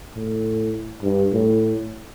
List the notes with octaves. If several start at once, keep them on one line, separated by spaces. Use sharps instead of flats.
A2
G2
A2